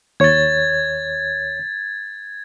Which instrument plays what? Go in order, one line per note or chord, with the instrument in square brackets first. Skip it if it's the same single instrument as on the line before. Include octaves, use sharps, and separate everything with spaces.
[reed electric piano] D#2 C#5 [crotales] G#6 A6